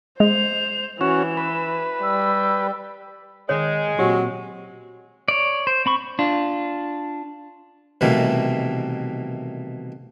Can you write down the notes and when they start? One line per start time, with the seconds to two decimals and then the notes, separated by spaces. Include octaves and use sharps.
0.20 G#3 C5 F7
1.01 E3 C#4 F#4 E7
1.37 B4
2.03 G3 E6
3.49 D#3 G#3 C#5
3.99 A#2 F#3 C4 G4
5.28 C#5 D5
5.67 C5
5.86 C4 B5 C#6
6.19 D4 F4
8.01 C2 B2 D#3 E3 A3 A#3